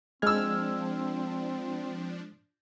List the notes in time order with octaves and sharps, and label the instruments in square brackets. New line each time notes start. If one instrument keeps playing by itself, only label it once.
[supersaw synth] F3 D4 [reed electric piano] G#3 G#6 [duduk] C4 [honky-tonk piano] E6 F6